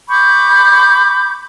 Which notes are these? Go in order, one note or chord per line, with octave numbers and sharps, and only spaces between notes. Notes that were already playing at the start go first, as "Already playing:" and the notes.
B5 C#6 D6 G6